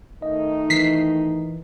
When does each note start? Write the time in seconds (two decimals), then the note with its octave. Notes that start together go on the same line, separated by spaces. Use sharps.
0.22 D#3 A3 D#4 D#5
0.70 E3 B6 C7